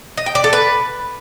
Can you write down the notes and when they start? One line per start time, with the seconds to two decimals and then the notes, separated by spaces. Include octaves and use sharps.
0.17 D#5
0.26 G5
0.35 D5
0.44 A4
0.53 B4